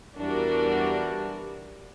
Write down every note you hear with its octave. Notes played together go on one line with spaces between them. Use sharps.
E2 E3 G3 D4 F#4 A#4